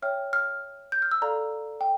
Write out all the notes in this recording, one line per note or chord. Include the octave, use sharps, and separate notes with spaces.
C#5 E5 G5 F6
F6
G6
F6
E6
A4 D5 F5 A#5
G5